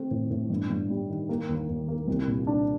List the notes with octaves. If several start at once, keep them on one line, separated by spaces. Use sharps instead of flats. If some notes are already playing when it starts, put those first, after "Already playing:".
Already playing: A3 C4
A2
A2
G2
G2
G3
D#3
A#3
D#2
D#2
A#3
C2
A#2
D4